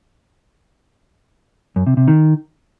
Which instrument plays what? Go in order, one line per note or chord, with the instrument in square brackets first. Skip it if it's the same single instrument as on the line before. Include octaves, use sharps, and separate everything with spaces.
[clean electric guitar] F#2
C3
C3
D#3